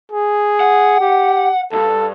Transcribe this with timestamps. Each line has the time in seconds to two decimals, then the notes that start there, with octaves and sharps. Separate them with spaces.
0.12 G#4
0.60 F#5
1.00 G4
1.73 C2 G2 A4